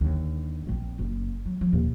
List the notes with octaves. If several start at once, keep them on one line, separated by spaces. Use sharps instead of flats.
D#2 D3
A#1 C4
F#1
F#3
F3
D#2 A#2